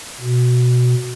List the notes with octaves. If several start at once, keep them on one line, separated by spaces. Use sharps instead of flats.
B2